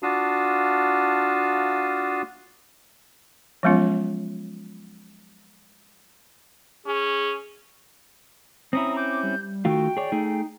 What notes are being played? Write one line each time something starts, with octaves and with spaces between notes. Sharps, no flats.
D4 F4 F#4 F5 A5 D#6
F3 F#3 G#3 B3 C#4 F4
C#4 G#4
C4 C#4 E4 A#5 D#6
D6 G6
G3
D#3 A3 F4 F#4 G5
G#4 C#5 D5
A3 D#4 G#4